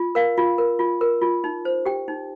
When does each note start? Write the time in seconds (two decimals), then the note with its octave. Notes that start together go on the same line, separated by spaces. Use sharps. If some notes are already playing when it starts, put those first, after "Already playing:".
Already playing: F4
0.15 A#4 F5
0.38 F4
0.58 A#4
0.79 F4
1.01 A#4
1.22 F4
1.44 D#4
1.65 C5
1.85 G4 G5
2.08 D#4